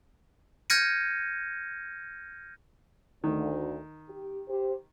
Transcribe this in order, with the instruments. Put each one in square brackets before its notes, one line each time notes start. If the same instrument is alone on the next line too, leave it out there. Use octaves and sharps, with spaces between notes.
[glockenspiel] F6 G6 G#6 A#6 C#7 D#7
[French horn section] D2 [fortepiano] D#3
[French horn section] G4
G4 C5